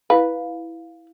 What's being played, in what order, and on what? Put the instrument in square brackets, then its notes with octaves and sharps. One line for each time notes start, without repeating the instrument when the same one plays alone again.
[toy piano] E4 F5 [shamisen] B4